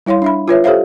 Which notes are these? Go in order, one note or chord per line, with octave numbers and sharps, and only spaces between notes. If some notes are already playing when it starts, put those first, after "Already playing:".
G3 E4 C#5 F5 C6
D4 E5 B5
F4 B4 C#5 E5
G4 A4 C5 C#5 E5 F5